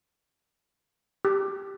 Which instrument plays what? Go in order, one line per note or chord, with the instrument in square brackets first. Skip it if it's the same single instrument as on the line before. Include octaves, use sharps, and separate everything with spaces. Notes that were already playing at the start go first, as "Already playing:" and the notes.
[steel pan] G4